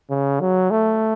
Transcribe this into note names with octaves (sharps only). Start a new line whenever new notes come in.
C#3
F#3
A3